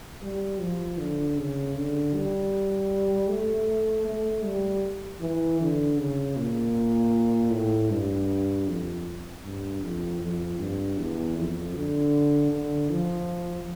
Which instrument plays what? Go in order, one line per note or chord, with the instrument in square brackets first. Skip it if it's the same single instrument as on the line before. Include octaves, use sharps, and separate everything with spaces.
[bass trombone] G3
F3
D3
C#3
D3
G3
A3
A3
G3
E3
D3
C#3
A#2
A2
G2
F2
G2
F2
F2
G2
E2
F2
D3
D3
F3